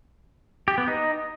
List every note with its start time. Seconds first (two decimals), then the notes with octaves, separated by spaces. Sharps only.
0.68 G4
0.78 B3
0.88 D#4